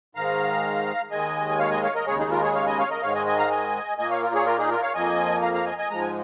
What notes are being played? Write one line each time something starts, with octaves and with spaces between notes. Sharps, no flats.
G#2 D#3 G#3 F5 A#5
D#2 D#3 G#3 D#5 G#5
G#5
C#5 F5
D#5 G#5
C#5 F5
A#4 D#5
D#2 C#3 G#3 G#4 C#5
D#4 G#4
F4 A#4
G#4 C#5
C#5 F5
D#5 G#5
C#5 F5
A#4 D#5
G#2 D#3 G#3 C#5 F5
D#5 G#5
D#5 G#5
F5 A#5
D#5 G#5
A#2 A#3 D#5 G#5
C#5 F5
F4 A#4
G#4 C#5
F4 A#4
D#4 G#4
F4 A#4
C#5 F5
F2 F3 A#3 D#5 G#5
F5 A#5
F5 A#5
D#5 G#5
D#5 G#5
G#2 F3 G#3 A#5
G#5